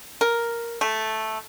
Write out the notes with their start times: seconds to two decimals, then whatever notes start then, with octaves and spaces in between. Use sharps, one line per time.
0.21 A#4
0.81 A3